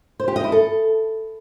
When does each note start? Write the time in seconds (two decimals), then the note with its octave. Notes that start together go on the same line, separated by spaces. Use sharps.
0.20 C5
0.28 G4
0.36 D#5
0.44 E4
0.52 A4